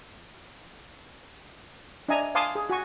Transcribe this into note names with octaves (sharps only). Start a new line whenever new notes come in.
D4 D#5 E5 G#5 A#5
F5 G#5 A5 C6 D6 D#6
G#4
F#4 G#5 C#6